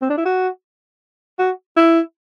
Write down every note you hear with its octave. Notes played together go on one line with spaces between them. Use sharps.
C4
D4
E4
F#4
F#4
E4